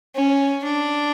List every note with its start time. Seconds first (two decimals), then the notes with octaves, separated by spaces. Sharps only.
0.16 C#4
0.64 D4